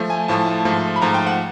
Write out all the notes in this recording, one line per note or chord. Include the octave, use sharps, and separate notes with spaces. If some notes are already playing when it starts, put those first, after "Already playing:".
Already playing: F3 A3
G#5
A2 F3 A3 A5
A5
G#2 F3 A3
B5
G#2 F3 A3 A#5
G5
F#5